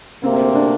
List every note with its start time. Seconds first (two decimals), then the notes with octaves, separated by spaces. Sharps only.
0.23 D2 C3 A#3 C4
0.35 C4
0.55 D4